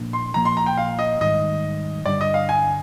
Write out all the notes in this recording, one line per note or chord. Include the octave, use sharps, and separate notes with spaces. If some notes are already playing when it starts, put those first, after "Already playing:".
Already playing: A#2 F3 A#3 D4
C6
A#2 F3 A#3 A#5
C6
A#5
G5
F5
D#5
G#2 D#3 G3 D#5
G2 D3 G3 D5
D#5
F5
G#5